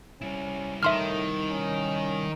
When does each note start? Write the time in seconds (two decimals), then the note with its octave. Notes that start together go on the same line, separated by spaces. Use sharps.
0.21 G3 C#4 E4
0.83 A2 D#3 E5 C6 F6
1.51 C#4